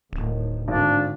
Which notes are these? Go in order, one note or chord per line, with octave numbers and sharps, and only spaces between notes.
D1 A2 D#3
G#1 D3 D4